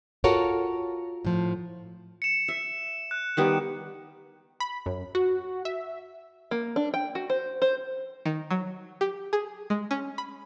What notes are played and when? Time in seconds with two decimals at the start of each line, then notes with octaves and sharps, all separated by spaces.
0.24 F4 F#4 A4 A#4 C#5
1.25 A2 F3
2.22 C#7 E7
2.48 E5
3.11 F#6
3.37 D#3 G3 B3
4.60 B5
4.86 F#2
5.15 F#4
5.65 E5
6.51 A#3
6.76 D4
6.94 G5
7.15 F#4
7.30 C5
7.62 C5
8.26 D#3
8.51 F#3
9.01 G4
9.33 G#4
9.70 G#3
9.91 C#4
10.18 B5